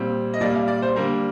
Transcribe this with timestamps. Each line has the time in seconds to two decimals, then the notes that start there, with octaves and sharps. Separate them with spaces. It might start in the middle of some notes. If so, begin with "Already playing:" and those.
Already playing: A#2 G3 C4
0.34 D#5
0.40 A#2 G3 A#3 D5
0.55 F5
0.68 D5
0.82 C5
0.96 D3 G3 A#3 A#4